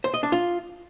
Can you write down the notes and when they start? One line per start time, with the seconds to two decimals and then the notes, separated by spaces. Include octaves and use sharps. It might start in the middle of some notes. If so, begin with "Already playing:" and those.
0.04 C5
0.14 D#5
0.23 D4
0.32 F4